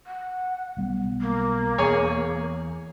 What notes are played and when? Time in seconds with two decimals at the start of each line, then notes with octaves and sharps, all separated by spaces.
0.07 F#5
0.77 B1 G3 B3
1.21 A#3
1.78 E2 G#4 C#5 G#5